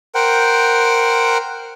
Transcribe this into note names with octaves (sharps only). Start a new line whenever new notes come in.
A#4 C5 F#5 G5